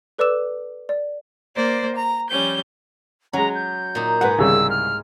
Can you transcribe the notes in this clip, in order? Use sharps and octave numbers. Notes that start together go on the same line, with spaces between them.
A4 B4 D5 D6 E6 E7
D5
A#3 C5 D5
A#5
F3 G3 C#4 G6
F#3 G#3 C#4 A#5
G6
A#2 D#4
G#2 G#3 B4 F#5
C2 C#3 G3 E6
F6